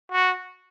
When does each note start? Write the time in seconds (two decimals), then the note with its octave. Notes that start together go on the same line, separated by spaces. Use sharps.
0.12 F#4